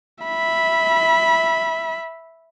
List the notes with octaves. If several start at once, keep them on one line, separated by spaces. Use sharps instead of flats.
E5 B5